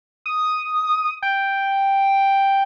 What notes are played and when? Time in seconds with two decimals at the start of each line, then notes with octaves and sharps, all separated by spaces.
0.26 D#6
1.22 G5